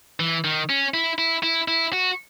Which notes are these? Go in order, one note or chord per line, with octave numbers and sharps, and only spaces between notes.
E3
D#3
C#4
E4
E4
E4
E4
F#4